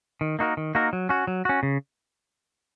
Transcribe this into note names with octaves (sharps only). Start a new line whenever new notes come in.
D#3
A#3 D#4 F#4 A#4
D#3
A#3 D#4 F#4 A#4
F#3
C#4 F#4
F#3
C#4 F#4
C#3